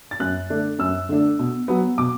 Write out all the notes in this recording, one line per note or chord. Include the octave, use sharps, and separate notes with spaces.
A6
F#2 F#6
D3 A3 D4
F#2 E6
D3 A3 D4
B2
F#3 B3
B2 D6